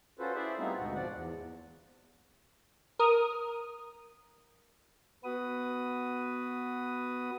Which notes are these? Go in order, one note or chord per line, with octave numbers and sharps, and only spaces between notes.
C#4 F4 F#4 A4 B4 C5
E4 G#4 C5 D5 E5
G3 A3 B3 C4 D#4 F4
D2 G#2 B2 F#4 F#5
F3 D5 F#5
E2
A#4 D#6
B3 F#4 B4 D#6